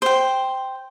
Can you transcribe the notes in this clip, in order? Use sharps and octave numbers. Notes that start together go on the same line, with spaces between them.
C5 G5